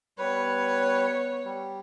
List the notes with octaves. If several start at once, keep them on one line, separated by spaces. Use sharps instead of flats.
G3 B3 B4 C#5
G3